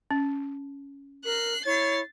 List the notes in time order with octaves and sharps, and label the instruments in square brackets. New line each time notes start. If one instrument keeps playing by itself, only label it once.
[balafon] C#4
[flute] A#4 [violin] F#6 C7
[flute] E4 [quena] C#5 [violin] A6 C7